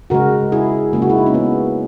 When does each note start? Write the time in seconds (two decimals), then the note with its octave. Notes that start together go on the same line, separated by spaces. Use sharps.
0.10 C#3 G#3 F#4 A#4
0.52 E4 G#4
0.93 C#3 G#3 A#3
1.02 F#4
1.10 E4
1.18 D#4
1.26 C#4
1.34 B3